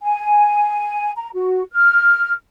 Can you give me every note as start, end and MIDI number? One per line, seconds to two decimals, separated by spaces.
0.02 1.11 80
1.17 1.29 82
1.34 1.63 66
1.72 2.32 89